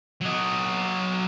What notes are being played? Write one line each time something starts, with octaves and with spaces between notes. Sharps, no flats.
F#3 D#5